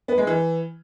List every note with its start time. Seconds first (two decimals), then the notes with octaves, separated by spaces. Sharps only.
0.08 B3
0.18 G#3
0.27 E3